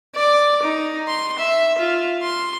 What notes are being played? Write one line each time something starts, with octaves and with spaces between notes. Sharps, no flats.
D5
D#4
C6
E5
F4
C6